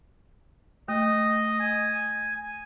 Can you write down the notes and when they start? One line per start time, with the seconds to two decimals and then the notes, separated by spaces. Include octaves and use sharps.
0.88 A3 D#5
1.60 G#5